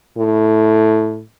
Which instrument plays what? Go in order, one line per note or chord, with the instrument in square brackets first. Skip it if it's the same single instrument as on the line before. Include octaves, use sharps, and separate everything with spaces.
[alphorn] A2